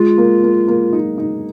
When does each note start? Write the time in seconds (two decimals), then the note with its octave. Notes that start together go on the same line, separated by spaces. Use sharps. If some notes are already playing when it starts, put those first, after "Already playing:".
Already playing: G#3 F4
0.18 A#3
0.43 A#3
0.68 A#3
0.93 D#4
1.18 D#4